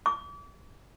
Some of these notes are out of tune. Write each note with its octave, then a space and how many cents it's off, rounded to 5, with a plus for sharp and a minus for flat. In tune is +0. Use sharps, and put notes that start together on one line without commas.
D6 -40